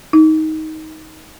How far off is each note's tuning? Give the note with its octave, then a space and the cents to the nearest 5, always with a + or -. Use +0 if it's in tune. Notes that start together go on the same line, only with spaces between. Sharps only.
D#4 +15